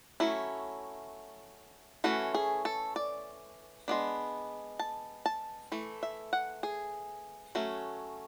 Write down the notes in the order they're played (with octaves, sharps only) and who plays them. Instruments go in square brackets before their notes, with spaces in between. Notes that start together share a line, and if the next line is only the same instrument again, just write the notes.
[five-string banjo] F#3 A3 C#4 E4
E3 A3 C#4 F#4
G#4
A4
D5
G#3 B3 D4
A5
A5
E3 A3
E5
F#5
G#4
F#3 A3 C#4